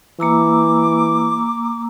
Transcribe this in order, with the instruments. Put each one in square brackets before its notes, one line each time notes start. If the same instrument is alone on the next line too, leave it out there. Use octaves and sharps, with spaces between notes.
[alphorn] E3 [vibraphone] A#3 A#5 E6 [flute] D6